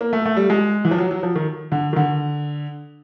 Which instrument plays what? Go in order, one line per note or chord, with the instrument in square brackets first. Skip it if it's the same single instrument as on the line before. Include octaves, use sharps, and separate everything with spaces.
[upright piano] A#3
A3
A3
G3
G#3
E3
F3
F#3
F#3
F3
D#3
D3
D#3
D3